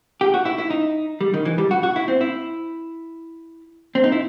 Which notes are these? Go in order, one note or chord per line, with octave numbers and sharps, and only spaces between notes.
G4
F#4
E4
E4
D#4
G3
D#3
E3
G3
F#4
F#4
E4
C4
E4
C4
D#4
E4